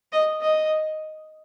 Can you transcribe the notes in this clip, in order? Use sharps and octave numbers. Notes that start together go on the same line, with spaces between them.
D#5
D#5